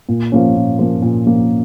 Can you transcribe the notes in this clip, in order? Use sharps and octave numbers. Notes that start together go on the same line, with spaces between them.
A#2
F3 A#3 C#4
A#2
F3 A#3 C#4
A#2
F3 A#3 C#4